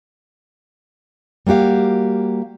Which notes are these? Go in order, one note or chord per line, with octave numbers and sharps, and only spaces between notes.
G3 A#3 F#4 G4 F5